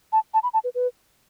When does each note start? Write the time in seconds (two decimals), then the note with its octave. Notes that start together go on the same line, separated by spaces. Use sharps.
0.12 A5
0.34 A5
0.43 B5
0.53 A5
0.64 B4
0.75 B4